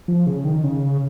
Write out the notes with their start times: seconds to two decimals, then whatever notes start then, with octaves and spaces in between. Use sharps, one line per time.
0.08 F3
0.27 C#3
0.45 D#3
0.64 C#3